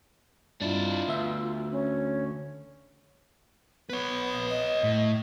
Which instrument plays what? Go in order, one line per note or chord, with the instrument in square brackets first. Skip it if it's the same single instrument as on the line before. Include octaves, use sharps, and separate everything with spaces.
[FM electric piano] G2 A6 [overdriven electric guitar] D4 E4 [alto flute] F4
[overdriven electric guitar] D2 [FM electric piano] B3 E5
[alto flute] C#4
[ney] B3 [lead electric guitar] B4 C#5
[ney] D#5
[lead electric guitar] A2